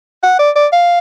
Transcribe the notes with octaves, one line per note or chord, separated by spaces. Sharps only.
F#5
D5
D5
F5